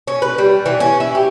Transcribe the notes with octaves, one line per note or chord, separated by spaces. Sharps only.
C#4
B4
G3
E3
C#4
E4
G4